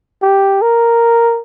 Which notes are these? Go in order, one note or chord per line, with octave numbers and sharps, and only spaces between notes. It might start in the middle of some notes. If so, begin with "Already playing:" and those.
G4
A#4